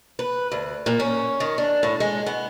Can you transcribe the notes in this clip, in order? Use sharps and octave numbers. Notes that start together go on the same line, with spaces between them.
B4
D2
A#2
C#4
D#3
D4
A2
G#3
B3